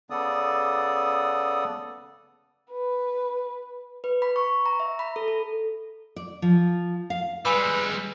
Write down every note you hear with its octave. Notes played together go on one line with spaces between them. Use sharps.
C#3 B3 A4 D5 D#6
B4
B4
B5
C#6
A#5
E5
B5
A4
A4
D5
F3
F5
G3 G#3 B4 G#5 B5 E6